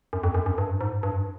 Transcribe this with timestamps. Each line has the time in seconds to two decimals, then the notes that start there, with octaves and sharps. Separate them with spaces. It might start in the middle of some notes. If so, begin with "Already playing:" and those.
0.13 F#2
0.24 F2
0.34 F#2
0.46 F#2
0.58 G2
0.81 G#2
1.03 G2